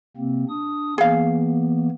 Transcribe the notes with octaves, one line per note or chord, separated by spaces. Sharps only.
C3 A#3 C4
D4 D#6
E3 A#3 B3 G#4 F5